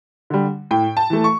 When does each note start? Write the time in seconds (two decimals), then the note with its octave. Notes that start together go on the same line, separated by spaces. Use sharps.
0.30 D3 G3
0.71 A2 G5
0.97 A5
1.10 E3 A3
1.24 C#6